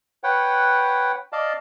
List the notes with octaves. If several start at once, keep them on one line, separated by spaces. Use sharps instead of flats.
B4 C#5 F#5 G5
D5 D#5 F5 A5